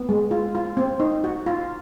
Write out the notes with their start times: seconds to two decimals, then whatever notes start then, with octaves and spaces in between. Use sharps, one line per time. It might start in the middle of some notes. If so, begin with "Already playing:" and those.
Already playing: B3
0.09 G#3
0.31 F4
0.55 F4
0.77 C4
1.00 D#4
1.24 F#4
1.46 F4